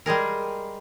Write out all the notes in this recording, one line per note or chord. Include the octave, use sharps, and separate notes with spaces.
G3 G#3 G#4 A#4